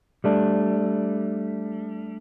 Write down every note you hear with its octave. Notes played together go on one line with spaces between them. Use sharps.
G3 A3 D4